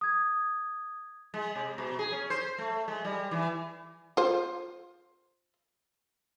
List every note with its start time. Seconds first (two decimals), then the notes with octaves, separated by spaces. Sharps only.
0.01 D#6 G#6
1.34 G#3
1.55 C3
1.78 B2
1.99 G#4
2.12 C#4
2.30 C5
2.58 A3
2.88 G#3
3.05 G3
3.31 E3
4.17 F4 C5